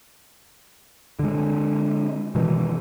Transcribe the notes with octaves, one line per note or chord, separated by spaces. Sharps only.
D3 G#3
B2 D#3 E3 G#3